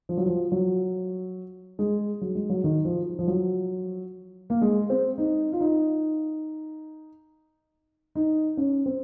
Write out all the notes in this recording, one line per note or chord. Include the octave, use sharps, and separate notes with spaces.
F3
F#3
F3
F#3
G#3
F#3
G#3
F#3
D#3
F3
F3
F#3
A#3
G#3
C4
D#4
F4
D#4
D#4
C#4
C4